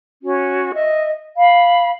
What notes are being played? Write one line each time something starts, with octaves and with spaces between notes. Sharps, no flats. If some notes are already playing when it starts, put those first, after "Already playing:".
C#4 F#4
D#5 E5
F5 B5